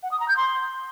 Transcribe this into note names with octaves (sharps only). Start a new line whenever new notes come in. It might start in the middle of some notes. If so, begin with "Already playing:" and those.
F#5
D#6
A#5
G6
C6